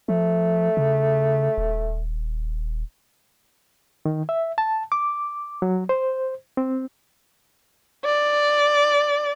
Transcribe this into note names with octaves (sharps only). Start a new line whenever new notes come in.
F3 A3
C#3
D#1
D#3
E5
A5
D6
F#3
C5
C4
D5